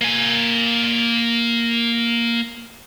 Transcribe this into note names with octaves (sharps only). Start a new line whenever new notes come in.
A#3 G#5